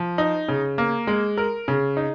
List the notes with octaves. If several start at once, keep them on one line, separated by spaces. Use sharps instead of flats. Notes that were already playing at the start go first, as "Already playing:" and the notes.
Already playing: F3
D#4
C#3
A#3
G#3
A#4
C#3
D#4